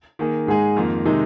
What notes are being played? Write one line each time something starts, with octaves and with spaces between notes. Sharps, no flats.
D#3 A#3 G#4
G#2 G#3 D#4 G#4
F2 D#3 A#3
C3 D#3 G#3 D#4